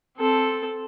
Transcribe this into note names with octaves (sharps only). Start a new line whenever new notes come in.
C4 A4